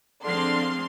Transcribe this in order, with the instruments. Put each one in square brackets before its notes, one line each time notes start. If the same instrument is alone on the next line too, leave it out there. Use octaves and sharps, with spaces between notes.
[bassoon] D3 [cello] F3 C4 [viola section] D4 G#4 F5 [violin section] C6